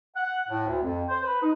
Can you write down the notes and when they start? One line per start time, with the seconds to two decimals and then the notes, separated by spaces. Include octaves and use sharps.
0.16 F#5
0.49 A2
0.67 D2
0.83 F2
1.09 C5
1.25 B4
1.41 D#4